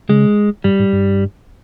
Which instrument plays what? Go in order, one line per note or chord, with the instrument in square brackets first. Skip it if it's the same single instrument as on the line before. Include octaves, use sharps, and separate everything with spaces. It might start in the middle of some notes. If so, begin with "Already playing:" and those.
[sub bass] C#3 [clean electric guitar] G#3
[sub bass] G2 [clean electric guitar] G3
[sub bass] G#2
G2